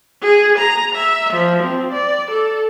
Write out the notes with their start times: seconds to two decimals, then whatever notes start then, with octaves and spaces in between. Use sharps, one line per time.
0.22 G#4
0.58 A#5
0.95 E5
1.33 F3
1.63 C4
1.92 D5
2.31 A4